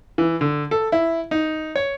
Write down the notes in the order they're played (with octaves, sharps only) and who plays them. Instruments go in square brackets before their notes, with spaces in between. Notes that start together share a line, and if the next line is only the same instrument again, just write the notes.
[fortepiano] E3
D3
A4
E4
D#4
C#5